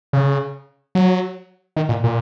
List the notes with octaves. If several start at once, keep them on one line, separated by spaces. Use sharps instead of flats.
C#3
F#3
D#3
A#2
A#2